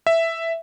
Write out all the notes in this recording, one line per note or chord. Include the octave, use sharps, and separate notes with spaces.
E5